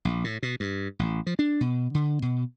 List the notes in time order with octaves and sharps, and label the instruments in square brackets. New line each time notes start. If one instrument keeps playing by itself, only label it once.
[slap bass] A#1
A2
B2
G2
A1
F3
D4
B2
D3
B2